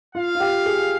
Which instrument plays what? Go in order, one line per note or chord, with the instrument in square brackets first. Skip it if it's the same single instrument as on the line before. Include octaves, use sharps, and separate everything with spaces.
[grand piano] F4 [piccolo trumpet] F5
[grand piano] F4
G4
G#4